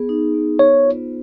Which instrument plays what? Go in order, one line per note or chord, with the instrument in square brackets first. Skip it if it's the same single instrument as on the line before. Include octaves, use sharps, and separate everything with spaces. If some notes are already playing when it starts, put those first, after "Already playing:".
Already playing: [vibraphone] B3 G#4
D#4
B3
[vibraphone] C5 [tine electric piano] C#5
[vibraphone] F4